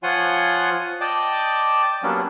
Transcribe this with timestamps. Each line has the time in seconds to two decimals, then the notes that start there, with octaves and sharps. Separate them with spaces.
0.03 F3 F4 C#5 F#5 G#5 C6
1.01 D5 D#5 G5 A5 D6
2.03 F#3 G3 A#3 B3 C#4 D4